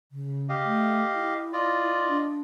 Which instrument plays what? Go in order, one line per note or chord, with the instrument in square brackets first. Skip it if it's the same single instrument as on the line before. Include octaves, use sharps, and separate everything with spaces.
[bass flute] C#3
[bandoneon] G4 D#5 F5
[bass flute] A3
E4
[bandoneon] F4 D5 D#5
[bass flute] D4